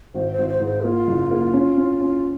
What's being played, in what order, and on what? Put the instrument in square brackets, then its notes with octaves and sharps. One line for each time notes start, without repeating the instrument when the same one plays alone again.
[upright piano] G#1 [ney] C5
[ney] C5
[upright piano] G#1
[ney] C5
[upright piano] G#2
[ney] C5
[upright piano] A#3 [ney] F4
[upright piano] F#1
A#3
C#4
C#4
C#4